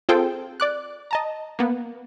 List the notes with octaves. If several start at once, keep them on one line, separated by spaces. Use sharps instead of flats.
C4 F4 G#4 A4 C5 G5
D5 D6 F#6
D#5 A5 A#5
A#3 B3